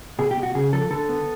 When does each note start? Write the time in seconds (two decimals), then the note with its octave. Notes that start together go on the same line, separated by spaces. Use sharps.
0.19 B2 G#4
0.31 G4
0.37 B2
0.43 F#4
0.55 C#3 G#4
0.73 F3 A4
0.91 D3 A4
1.09 B3